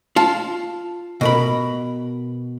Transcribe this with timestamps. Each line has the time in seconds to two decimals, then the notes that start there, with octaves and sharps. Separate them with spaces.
0.16 F4 A5
1.21 B2 A#4 B5